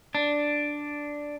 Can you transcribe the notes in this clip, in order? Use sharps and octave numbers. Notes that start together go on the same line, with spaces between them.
D4